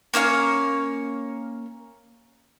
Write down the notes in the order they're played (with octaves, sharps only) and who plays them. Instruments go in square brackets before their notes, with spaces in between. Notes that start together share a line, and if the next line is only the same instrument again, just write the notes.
[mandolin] A#3 C#4 C#5 F5